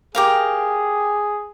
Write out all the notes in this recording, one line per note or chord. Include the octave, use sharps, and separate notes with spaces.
G4 G#4 A#4 F5